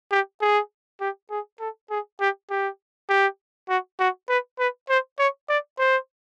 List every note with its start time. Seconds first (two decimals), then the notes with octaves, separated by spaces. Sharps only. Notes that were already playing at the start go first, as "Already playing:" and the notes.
0.11 G4
0.41 G#4
1.00 G4
1.31 G#4
1.60 A4
1.90 G#4
2.20 G4
2.50 G4
3.09 G4
3.69 F#4
3.99 F#4
4.29 B4
4.59 B4
4.89 C5
5.19 C#5
5.49 D5
5.79 C5